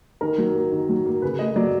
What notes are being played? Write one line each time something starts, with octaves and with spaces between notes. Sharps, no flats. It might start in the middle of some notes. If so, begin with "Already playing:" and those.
D#3 A#4
F#3
A#3
D#3
F#3
A#3
C#3 B4
A3 D#5
F#3 D5